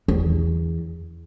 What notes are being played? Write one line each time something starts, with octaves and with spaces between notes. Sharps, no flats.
E2